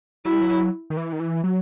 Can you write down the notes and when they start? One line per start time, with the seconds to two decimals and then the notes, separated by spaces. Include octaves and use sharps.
0.24 F#3 E4
0.32 G3
0.41 F#3
0.90 D#3
0.97 E3
1.13 D#3
1.20 E3
1.44 F#3